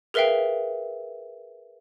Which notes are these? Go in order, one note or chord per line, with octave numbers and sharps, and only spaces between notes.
G#4 A#4 B4 E5 F5 G5